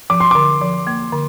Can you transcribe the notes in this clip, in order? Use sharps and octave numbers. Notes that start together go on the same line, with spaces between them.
F3 D6
C6
D3 D6
F3
A#3
D3